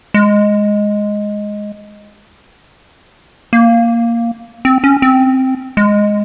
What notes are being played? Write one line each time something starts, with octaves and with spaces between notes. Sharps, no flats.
G#3
A#3
C4
C#4
C4
G#3